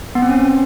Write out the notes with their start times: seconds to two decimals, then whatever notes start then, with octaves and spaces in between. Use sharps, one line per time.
0.15 B3
0.22 C4
0.29 C#4